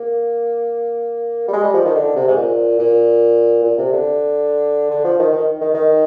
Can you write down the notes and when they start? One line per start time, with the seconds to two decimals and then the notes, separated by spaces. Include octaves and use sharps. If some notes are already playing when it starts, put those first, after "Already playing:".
Already playing: A#3
1.48 G3
1.53 G#3
1.63 G3
1.74 F3
1.85 D#3
1.95 D3
2.15 C3
2.28 G#2
2.37 A#2
2.79 A#2
3.64 A#2
3.78 C3
3.92 D3
4.91 D3
5.04 F3
5.19 D#3
5.33 D#3
5.61 D#3
5.74 D#3